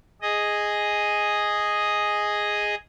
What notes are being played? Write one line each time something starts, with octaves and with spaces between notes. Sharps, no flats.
G#4 D#5